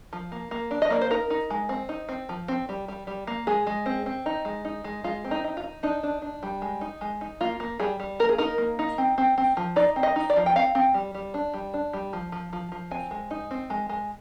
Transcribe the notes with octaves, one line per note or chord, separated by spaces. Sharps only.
F3
A#3
A#3
D4
D#5
A#3 D5
C5
D#4 A#4
D#4
G#3
C4
D#4
C4
F3
C4
G3
G3
G3
A#3
G#3 G#4
G#3
C4
C4
D#4
G#3
D#4
G#3
G#3 F4
C4
D#4
D#4
F4
D#4
D4 D#4
D4
D4
G3
G#3
D#4
G#3
D#4
A#3 F4
A#3
G3 G#4
G3
A#3 A#4
G#4
D#4 A#4
A#3
D#4
C4
C4
C4
F3
D#4 D5
C4
D#5
D#4
D5
F3
G5
C4 F5
C4
G3
G3
D4
G3
D4
G3
F3
F3
F3
F3
C4 G#5
G#3
D#4
C4
G#3
G#3